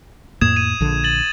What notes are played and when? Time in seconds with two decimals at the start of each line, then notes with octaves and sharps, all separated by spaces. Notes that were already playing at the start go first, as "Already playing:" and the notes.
0.41 F2 A2 A#3 D#6 G#6 E7
0.57 D#7
0.80 A#1 D3
1.04 A6 F#7